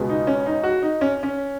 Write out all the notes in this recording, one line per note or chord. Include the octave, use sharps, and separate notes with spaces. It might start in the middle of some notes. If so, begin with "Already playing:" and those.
Already playing: C#2 B2 G#3 B3
D#4
C#4
D#4
F#4
D#4
C#4
C#4